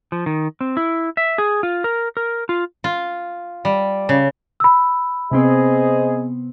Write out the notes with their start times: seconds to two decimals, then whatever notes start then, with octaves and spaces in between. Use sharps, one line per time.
0.12 F3
0.26 D#3
0.61 C4
0.77 E4
1.17 E5
1.38 G#4
1.63 F4
1.84 A#4
2.17 A#4
2.49 F4
2.84 F4
3.65 G3
4.09 C#3
4.60 B5 E6
5.31 C3 B3 C4 G#4 C5 D#5